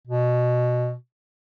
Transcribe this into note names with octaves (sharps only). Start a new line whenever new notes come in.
B2